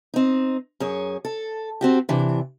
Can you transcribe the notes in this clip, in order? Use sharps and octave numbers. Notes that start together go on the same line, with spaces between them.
C4 D#4
F#2 G#4 C#5
A4
C4 F#4 G4
C3 E3 D4